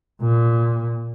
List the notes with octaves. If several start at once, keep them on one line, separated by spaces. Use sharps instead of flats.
A#2